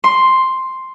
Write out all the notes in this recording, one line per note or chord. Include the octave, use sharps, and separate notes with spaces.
C6